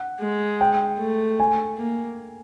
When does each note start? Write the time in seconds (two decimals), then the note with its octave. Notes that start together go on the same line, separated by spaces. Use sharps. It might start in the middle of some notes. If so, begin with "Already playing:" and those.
Already playing: F#5
0.21 G#3
0.61 G5
1.00 A3
1.40 G#5
1.79 A#3